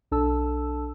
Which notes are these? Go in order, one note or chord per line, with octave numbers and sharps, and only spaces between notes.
B1 D4 A4 A5 E6